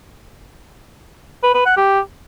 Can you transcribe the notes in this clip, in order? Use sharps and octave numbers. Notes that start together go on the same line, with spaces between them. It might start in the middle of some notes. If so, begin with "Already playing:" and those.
B4
B4
F#5
G4